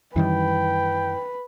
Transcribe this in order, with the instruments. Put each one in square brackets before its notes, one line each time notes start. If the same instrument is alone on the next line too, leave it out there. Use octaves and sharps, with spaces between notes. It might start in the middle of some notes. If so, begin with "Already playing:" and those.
[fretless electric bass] F#2 D#3 G3 [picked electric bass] E3 [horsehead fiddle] B4 [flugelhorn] G5